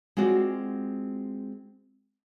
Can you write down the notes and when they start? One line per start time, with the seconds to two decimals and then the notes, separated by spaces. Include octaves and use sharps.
0.17 G#3 C4 F4 F#4 D5